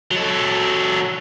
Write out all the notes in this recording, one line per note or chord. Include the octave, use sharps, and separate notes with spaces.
F#3 A4